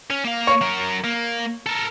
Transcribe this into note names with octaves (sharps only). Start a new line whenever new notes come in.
C#4
A#3 F5
C#5
F#3 A#4
A#3
A4 A#4